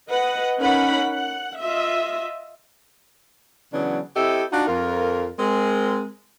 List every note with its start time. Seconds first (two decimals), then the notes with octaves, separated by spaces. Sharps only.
0.11 B4 D#5 F#5
0.58 C#4 D#4 A#4 F#5 B5
1.13 F#5
1.59 F4 D#5 E5
3.73 C#3 E3 F#3 B3 D4
4.16 C4 E4 G4 A4 D#5 E5
4.52 D4 D#4 F4 F#4
4.67 F2 F4 A#4
5.39 G#3 C4 A#4